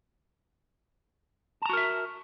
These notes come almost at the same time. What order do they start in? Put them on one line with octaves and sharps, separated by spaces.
A5 A#5 F#4 A#4 E5